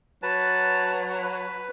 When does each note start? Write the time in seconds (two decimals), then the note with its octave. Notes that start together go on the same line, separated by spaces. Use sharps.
0.23 F#3 B4 A5
1.23 B4